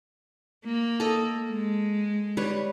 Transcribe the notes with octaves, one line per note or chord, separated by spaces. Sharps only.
A#3
A4 D#5
G#3
G3 B4 C#5